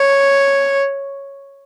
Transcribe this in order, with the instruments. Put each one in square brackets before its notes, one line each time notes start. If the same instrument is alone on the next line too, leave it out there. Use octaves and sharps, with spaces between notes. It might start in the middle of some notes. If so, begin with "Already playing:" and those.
Already playing: [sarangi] C#5